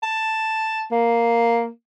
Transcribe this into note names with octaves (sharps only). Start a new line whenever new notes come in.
A5
A#3